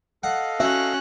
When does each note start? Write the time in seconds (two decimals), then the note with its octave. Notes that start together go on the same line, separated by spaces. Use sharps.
0.23 A4 D#5 F5 F#5
0.60 C#4 F#4 E5 F#6